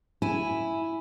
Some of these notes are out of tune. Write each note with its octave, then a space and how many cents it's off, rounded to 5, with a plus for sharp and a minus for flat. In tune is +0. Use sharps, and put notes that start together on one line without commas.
E4 +0 G#5 +0